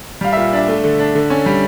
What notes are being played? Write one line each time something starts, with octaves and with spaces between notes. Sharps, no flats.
G3 F5
A#2 E5
D4 E5
A3
D3
D4
D3
C#4
G3